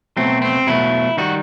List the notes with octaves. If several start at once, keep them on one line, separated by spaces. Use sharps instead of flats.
B2 F#3 A3 C4
C4
B2 F#3 A3 E4
D#3 G3 F#4